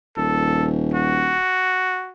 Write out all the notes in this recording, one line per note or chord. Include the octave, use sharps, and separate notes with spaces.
D#1 A4
F#4